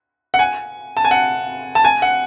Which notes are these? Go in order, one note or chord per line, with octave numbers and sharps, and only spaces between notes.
F#5
G#5
A5
G#5
F#5
A5
G#5
F#5